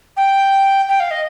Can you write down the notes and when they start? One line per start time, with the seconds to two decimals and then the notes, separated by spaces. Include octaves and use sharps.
0.17 G5
0.89 G5
1.00 F5
1.11 D#5